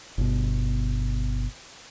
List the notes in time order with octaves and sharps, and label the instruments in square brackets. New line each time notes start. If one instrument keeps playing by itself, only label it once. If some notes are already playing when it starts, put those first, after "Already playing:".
[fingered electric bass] G1 B2